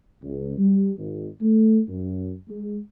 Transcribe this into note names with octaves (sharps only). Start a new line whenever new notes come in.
C#2
G3
G#1
A3
F#2
G#3